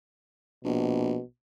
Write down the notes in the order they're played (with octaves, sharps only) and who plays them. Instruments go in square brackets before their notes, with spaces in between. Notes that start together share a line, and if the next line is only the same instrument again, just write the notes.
[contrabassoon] A#1 [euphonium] B2